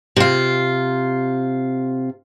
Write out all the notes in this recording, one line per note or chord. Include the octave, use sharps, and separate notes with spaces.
C3 F4